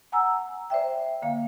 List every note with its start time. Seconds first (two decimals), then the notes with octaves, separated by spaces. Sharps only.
0.12 F#5 G#5 A#5 E6
0.70 C5 D5 E5 G5
1.22 D3 A#3 F5